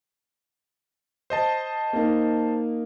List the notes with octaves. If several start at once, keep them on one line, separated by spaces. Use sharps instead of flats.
C5 D#5 A5
A#3 D#4